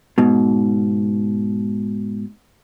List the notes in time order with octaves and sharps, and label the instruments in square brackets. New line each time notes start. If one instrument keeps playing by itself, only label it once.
[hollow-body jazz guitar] G#2 B2